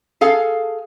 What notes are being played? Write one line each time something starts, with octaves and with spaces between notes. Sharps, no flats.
G#4 A4 F5